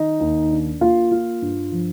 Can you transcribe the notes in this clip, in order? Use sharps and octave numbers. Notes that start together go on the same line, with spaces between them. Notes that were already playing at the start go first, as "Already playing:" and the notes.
Already playing: D#3 D#4 D#5
D#2
D4
A#3 F4 F5
F4
G2
F3